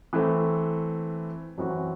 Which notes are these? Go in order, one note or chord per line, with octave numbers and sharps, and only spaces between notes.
E3 A3 C4
F#2 E3 C4 F#4